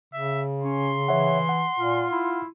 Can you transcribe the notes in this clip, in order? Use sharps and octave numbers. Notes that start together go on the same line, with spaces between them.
C#3 E5
C#4 C6
E3 C#5 E5 F#5
F#5
A#2 F4
E4